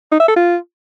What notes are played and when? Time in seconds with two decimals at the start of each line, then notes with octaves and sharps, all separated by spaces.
0.12 D#4
0.20 E5
0.28 A4
0.36 F4